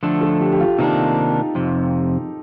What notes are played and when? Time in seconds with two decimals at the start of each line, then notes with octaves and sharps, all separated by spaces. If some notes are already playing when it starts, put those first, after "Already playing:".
0.03 D3 F3 A3 D4
0.21 A4
0.41 G4
0.52 G4
0.60 F4
0.79 C3 D#3 A#3 D4 D#4
1.55 F2 C3